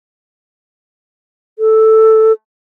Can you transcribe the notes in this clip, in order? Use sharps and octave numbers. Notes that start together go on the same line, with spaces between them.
A4